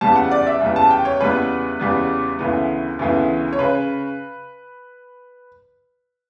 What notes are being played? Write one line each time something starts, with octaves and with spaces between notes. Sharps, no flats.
E2 C#3 G3 B3 A5
F#5
D5
E5
E2 C#3 G3 B3
A5
G5
C#5
E2 C#3 G3 B3 B4
E2 C#3 G3 B3
D2 C#3 E3 B3
D2 C#3 E3 B3
C#5
C#3 B4